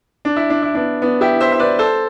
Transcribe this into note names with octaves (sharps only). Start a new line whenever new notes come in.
D4
E4
D4
E4
B3 D4
B3 D4
E4 G4
C5 E5
E5
B4 D5
A4 C5